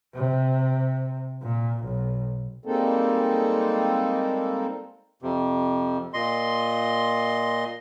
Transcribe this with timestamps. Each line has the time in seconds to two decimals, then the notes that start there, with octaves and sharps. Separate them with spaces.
0.15 C3
1.42 A#2
1.84 B1
2.66 G3 G#3 A#3 C4 D#4 A4
5.22 F2 C3
6.14 A#2 D#5 C6